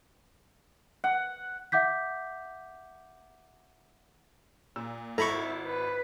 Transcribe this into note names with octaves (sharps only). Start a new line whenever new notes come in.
F#5
E5 F#5 D6 G6 B6
A#2 E6
G#1 E4 A4 A#5 B5 C#6
B4